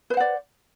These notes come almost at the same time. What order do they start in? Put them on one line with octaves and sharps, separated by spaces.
B4 C5 F#5 D5